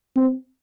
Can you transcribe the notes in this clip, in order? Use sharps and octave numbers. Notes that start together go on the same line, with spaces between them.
C4